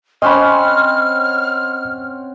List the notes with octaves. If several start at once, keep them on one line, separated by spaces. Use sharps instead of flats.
C4 C#4 D#5 F#5 B5 F6